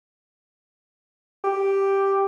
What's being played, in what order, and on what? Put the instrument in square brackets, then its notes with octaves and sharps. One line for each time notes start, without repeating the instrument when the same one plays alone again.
[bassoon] G4